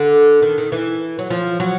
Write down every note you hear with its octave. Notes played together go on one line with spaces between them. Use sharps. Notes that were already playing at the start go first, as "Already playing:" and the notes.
Already playing: D3
D#3
D#3
E3
F#3
F3
F#3